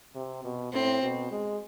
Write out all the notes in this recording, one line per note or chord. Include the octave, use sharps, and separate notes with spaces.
C3
B2
A2 C4
B2
G#3